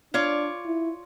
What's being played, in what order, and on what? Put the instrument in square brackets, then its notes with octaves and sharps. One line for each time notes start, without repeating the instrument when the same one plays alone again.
[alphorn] D4 [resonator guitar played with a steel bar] F4 C#5 D5
[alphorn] E4